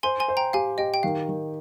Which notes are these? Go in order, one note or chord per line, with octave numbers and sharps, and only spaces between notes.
C5 G#5 C6
G#5 C6
C5
G5 A#5
G4 F5 G#5
G4 D#5 G5
G5
D#3 F5
D#3